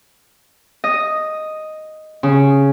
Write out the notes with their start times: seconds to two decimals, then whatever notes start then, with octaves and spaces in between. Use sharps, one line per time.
0.84 D#5
2.23 C#3